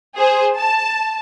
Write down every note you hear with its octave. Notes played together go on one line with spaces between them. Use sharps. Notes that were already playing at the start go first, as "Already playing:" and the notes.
G#4 C5
A5